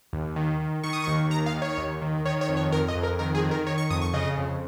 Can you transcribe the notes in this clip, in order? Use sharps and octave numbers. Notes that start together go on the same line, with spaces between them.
D#2
D#3
D#3
D#3 C#6
D#6
C#6
D#2
D#3 A#5
F5
D#3
C#5
D#2
D#3
D#3 C#5
C#5
F2
C#5
F2 A#4
D#5
F2
A#4
D#3 A#4
G#4
D#3
A#4
D#3 C#5
C#6
F2 D#6
C#6
C#3 D#5
F2